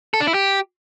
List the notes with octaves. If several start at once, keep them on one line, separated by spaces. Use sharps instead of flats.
A4
D4
E4
G4